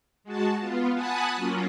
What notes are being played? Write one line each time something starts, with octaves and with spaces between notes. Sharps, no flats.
G#3 F#4 A5
B3 F4
F#5 G#5 A5 B5 D#6 F#6
F#3 A#3 C#4 F4